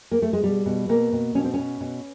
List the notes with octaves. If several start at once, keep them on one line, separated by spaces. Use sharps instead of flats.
A#3
A3
G#3
B2 G3
B2
B2 A#3
B2
B2 C#4
C4
B2 C#4
B2